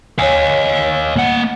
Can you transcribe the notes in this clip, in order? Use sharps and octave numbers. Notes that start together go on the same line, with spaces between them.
C#5 D#5 F5 G#5
A#3 F#5